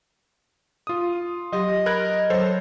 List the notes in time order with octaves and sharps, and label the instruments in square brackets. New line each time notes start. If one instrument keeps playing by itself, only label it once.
[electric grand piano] F4 D#6
[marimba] F#3 G4 C6 [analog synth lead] D#5
[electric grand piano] A#4 F#6 G#6 [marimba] B5
[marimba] F#3 [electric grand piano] A4 C5 C#5